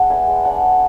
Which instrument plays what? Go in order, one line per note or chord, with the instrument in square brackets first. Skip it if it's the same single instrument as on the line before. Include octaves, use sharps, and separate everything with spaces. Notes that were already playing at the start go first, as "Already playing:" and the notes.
Already playing: [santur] G#3 D4 F#5
B3 E5 G#5
G#3
D4 F#5 A5
G#3